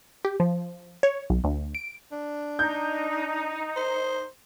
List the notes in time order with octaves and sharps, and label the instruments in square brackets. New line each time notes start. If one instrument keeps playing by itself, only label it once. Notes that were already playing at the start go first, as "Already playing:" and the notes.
[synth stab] G4
F3
C#5
B1
D2
D7
[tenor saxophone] D4
[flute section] D#4 [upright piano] G6
[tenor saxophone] C5